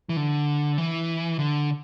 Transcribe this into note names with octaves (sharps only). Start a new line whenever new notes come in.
E3
D3
E3
D3